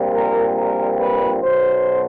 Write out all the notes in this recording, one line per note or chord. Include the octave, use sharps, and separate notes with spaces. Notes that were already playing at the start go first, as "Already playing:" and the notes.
Already playing: A#1 A#2 G3 C4
A#4
A#4
B4
B1 B2 F#3 C5